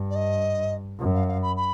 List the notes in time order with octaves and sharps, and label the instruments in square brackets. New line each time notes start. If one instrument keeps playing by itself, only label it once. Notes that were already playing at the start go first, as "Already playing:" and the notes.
Already playing: [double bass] G2
[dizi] D5
D#5
[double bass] F#2
[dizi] F5
F5
B5
B5